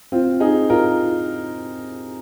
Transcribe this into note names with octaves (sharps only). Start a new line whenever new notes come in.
C4 F4
D#4 G#4
F4 A#4